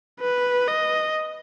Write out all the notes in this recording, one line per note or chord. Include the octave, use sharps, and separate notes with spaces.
B4
D#5